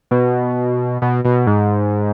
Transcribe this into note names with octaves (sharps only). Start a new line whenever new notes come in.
B2
B2
B2
G#2